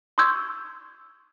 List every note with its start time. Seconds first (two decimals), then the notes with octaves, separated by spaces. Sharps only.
0.18 C6 C#6 D#6 E6 G6 G#6